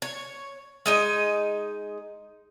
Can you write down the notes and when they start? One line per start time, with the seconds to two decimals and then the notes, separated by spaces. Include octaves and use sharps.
0.02 C#5
0.86 G#3 D#4 D#5